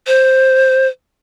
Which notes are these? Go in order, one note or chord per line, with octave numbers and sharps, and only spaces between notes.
C5